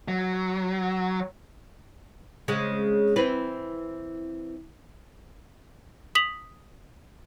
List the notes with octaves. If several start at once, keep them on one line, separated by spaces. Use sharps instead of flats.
F#3
C#3 G#3 C4
E3 C4 B4
D#6 B6 F7 F#7